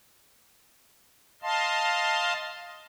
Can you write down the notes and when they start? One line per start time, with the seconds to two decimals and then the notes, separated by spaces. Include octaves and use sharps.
1.42 D#5 F5 A5 C6